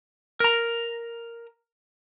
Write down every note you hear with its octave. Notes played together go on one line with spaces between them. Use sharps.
A#4 A#5